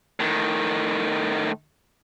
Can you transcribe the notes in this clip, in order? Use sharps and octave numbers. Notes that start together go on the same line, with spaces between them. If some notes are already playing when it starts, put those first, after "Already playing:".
A2 D#3